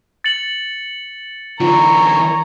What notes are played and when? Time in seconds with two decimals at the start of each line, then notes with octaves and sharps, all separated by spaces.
0.24 A6 C#7 F#7
1.60 D3 E3 F4 C#5 A#5